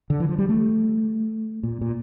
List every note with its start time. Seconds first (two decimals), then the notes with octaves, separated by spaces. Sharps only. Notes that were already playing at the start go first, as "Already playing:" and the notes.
0.10 D3
0.20 E3
0.29 F3
0.38 G3
0.49 A3
1.63 A#2
1.81 A#2